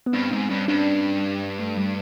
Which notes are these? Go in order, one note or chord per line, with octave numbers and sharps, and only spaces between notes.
B3
G2 C4
G#2 C4
G2 C#4
G2 D4
A3
G3